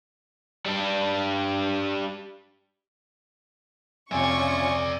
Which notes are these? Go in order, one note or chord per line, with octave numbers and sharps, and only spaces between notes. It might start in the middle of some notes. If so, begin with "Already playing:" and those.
G3 D4
F2 C3 C#4 F4 D5 E5 G#5 C#6